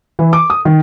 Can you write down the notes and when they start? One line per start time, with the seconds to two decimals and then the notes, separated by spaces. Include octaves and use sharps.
0.19 E3
0.33 D6
0.50 D#6
0.65 D#3